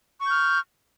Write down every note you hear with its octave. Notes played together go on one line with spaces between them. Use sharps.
C#6 F6 G6